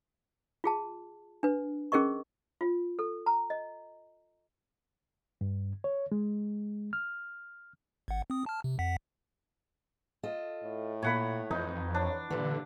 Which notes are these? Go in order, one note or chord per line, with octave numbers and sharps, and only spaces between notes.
F4 G#4 A5
D4 B4
C#4 G#4 A#4 D#5 C#6
F4
A4
A#5
D#5
G2
C#5
G#3
F6
G#1 F#5
C4 D#6
A5 F6
C3
F2 F#5 B6
F4 A4 D#5
A2
A#2 C#5 F#5 B5
F2 E3 D#4
D4 C#5
G2 A#2 D3 E3